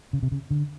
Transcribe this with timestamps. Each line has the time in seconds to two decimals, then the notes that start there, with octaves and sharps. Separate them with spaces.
0.13 C#3
0.23 C3
0.32 C#3
0.51 D3